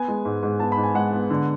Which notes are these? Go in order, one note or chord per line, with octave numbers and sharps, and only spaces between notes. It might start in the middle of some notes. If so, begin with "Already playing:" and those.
Already playing: B3 G#5
G#3
G#2
G#2
B3 A5
B5
G#2
G#5
G#3 F#5
B3
D3